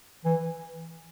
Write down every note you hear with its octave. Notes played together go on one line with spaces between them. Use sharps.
E3